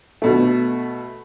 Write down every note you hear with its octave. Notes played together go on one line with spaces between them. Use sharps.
B2 A3